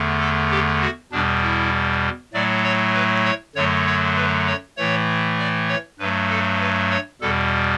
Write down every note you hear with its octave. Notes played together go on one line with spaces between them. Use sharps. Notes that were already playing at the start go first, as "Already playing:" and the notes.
Already playing: E2 D3 A3
A4
G4
F#4
E2 B2 G3 D4
E4
A2 F#3 A3 D5
C#5
B4
C#5
F#2 D3 F#3 A3 C#5
C#5
B4
C#5
A2 E3 A3 C#5
D5
C#5
G2 F#3 A3 B4
A4
B4
C#5
E2 B2 G3 A4